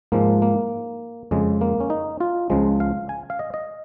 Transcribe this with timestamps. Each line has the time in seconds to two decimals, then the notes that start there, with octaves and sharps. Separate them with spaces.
0.12 G#2 F3 G#3 A#3
0.42 A#3
1.31 F2 C#3 G#3
1.61 A#3
1.80 C#4
1.90 D#4
2.20 F4
2.50 C#2 C#3 F3 G#3
2.80 F5
3.09 G#5
3.30 F5
3.39 D#5
3.54 D#5